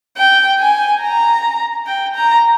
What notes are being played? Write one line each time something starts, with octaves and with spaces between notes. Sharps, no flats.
G5
G#5
A#5
G5
A#5